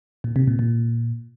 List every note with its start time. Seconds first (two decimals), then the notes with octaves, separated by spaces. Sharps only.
0.24 A#2
0.36 C3
0.47 A#2
0.59 A#2